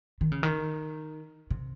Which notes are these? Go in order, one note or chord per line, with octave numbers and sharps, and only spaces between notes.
D#3
C#3
D#3
C3